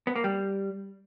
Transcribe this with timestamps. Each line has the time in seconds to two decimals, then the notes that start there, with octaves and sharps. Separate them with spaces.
0.07 B3
0.16 A#3
0.24 G3